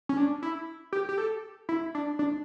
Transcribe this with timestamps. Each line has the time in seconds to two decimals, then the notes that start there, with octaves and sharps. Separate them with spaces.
0.09 C#4
0.17 D4
0.43 E4
0.93 G4
1.09 G4
1.18 A4
1.69 E4
1.95 D4
2.19 D4